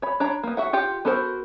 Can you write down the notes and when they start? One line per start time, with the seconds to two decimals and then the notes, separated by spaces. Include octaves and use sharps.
0.02 C#5 B5
0.20 D4 C#5 A#5 B5
0.43 A#3 B3
0.57 F#4 E5 F#5
0.73 F4 G4 F#5
1.05 B3 F#4 A4 A#4 C5